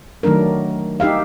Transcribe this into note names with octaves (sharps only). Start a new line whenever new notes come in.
D#3 F#3 A3 D4 A#4
D#4 G4 E5 F5